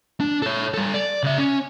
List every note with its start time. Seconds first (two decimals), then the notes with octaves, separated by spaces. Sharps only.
0.20 D4
0.42 A4 C#5
0.74 G3 A4
0.94 D5
1.23 C#3 E5
1.38 C#4